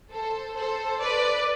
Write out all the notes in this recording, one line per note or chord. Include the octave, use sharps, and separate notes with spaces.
A4 C5
A4 C5
B4 D5